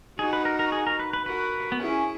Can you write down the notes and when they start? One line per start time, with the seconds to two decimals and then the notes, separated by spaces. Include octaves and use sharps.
0.19 D#4 F#4 G#4
0.33 B4
0.45 A#4
0.59 A#4
0.72 G#4
0.87 A#4
0.99 B4
1.13 B4
1.26 F#4 A#4 B4
1.72 B3
1.80 C#4 E4 G#4